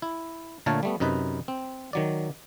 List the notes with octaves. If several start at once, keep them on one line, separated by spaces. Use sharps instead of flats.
E4
A#2 D3 A3 A#4 C#5 A5
G3 A3 B3
F#2 C3 D#4 B4
C4
D#3 F#3 D5